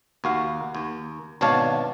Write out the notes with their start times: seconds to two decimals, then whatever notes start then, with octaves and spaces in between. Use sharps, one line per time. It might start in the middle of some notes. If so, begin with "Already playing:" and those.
0.24 D#2 F#4 F5
0.75 D#2
1.41 G#1 B2 D4 C#5 F5 A5